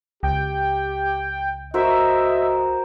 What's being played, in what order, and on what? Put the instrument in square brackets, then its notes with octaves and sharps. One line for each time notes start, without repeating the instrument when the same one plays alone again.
[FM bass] C#2 [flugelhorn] G4 [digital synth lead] G5
[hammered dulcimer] F#4 A#4 C5 [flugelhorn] D#5 [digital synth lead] E5